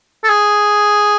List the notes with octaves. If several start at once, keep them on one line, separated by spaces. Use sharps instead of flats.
A4
G#4